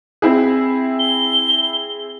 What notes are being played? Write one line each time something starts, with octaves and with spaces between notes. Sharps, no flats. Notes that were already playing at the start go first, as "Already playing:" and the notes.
C4 E4 G#4
G7